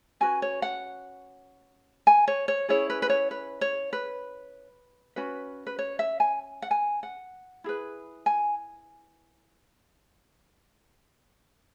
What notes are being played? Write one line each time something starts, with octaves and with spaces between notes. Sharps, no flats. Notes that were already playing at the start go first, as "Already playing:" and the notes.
C#4 F#4 B4 G#5
C#5
F#5
G#5
C#5
C#5
C#4 E4 G#4 C#5
B4
B4
C#5
B4
C#5
B4
C#4 F#4 B4
B4
C#5
E5
G#5
F#5
G#5
F#5
E4 G#4 B4
G#5